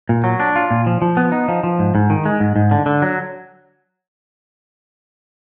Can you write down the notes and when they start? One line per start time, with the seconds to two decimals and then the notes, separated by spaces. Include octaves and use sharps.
0.09 A#2
0.24 F#3
0.40 D4
0.56 F4
0.71 A#2
0.87 F3
1.02 F3
1.17 B3
1.32 D#4
1.48 F3
1.64 F3
1.79 G#2
1.95 G#2
2.10 D#3
2.26 G#3
2.40 G#2
2.56 G#2
2.71 D3
2.86 D3
3.02 F#3